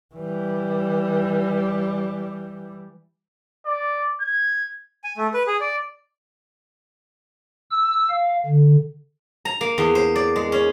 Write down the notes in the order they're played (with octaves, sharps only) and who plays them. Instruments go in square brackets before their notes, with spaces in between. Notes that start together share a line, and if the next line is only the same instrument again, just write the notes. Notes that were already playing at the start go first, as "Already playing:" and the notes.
[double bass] E3 G3
[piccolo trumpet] D5
G#6
[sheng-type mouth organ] G#5
A3
B4
G#4
D5
[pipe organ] E6
F5
D3
[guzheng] A#5
A#3
E2
C5
D5
G#3
C#4